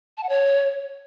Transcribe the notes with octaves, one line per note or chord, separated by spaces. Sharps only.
A5
F#5
C#5